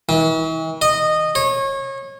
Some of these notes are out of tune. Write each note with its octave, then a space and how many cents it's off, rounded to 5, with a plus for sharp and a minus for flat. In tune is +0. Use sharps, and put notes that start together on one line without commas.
E3 -45
D#5 -15
C#5 -30